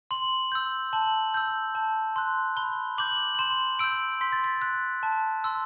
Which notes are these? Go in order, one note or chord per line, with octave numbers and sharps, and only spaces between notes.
C6 F#7
E6 G6
A5 F#7
E6 G6
A5
C6 F#6
B5 G7
D6 G6 F#7
F#7
C6 E7
E6 G6 D7
C6 B6
A6
B6
F#6
A5
C6 E6